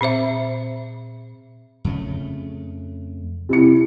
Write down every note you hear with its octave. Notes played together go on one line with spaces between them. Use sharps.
A#2 C4 C5 E5
F2 C#3 A3
C3 E4 C#7